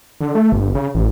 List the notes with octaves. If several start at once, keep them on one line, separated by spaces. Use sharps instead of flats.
D3
A3
G1
C#3
A1